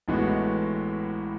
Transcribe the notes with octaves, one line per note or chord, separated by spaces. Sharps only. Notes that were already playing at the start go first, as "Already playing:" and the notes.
A1 A2 G#3 B3 F#4